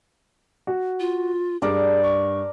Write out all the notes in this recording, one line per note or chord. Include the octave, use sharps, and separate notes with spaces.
F#4
F4
G2 G#4 A#4 D5 A5
C#6